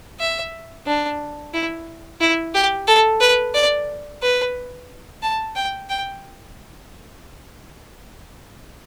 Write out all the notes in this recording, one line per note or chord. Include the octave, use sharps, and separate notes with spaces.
E5
D4
E4
E4
G4
A4
B4
D5
B4
A5
G5
G5